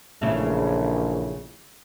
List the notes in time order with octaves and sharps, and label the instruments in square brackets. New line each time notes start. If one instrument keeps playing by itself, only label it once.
[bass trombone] A#1 [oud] E2 C#3 A3